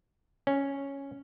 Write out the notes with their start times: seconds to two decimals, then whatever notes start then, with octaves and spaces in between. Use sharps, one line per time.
0.47 C#4